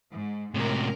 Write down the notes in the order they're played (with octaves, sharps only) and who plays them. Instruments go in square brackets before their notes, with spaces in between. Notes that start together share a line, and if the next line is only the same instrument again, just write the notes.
[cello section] G#2
[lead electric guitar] A2 C3 [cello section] G#3 C#4 A#4